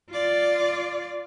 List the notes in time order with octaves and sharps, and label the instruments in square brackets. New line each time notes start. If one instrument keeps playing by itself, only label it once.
[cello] F4 D5